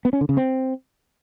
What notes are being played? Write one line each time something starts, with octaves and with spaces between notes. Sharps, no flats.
B3
C#4
D3
C#3
C4